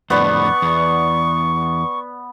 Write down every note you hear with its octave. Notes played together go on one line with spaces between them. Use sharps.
F2 A2 D3 B3 D5 C#6
E2